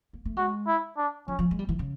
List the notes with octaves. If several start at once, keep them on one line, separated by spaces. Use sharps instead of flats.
A#3
A3
G#3 F#4
E4
D4
F3 C#4
F3
G#3
G3
E3
C#3